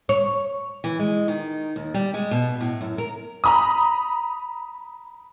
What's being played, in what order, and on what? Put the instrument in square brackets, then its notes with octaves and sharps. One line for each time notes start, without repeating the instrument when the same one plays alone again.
[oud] C#5
[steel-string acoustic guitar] E3
G#3
D#3
D#2
G3
G#3
B2
A2
F#2
A#4
[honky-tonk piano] A#5 B5 D#6